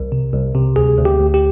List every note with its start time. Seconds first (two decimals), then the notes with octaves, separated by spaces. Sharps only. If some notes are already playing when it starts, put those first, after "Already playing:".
Already playing: C2
0.12 C3
0.33 C2
0.55 C3
0.76 D2 G#4
0.98 D2
1.05 G4
1.19 D2
1.34 G4